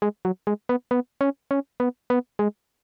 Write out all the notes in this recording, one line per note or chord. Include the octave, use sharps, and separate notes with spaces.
G#3
F#3
G#3
B3
B3
C#4
C#4
B3
B3
G#3